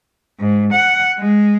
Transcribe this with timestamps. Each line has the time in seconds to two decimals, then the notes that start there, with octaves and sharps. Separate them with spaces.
0.40 G#2
0.73 F#5
1.19 G#3